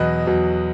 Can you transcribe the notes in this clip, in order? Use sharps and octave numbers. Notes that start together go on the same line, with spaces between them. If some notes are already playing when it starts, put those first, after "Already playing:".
Already playing: E2 B2 F#3 B4 D#5
E2 B2 F#3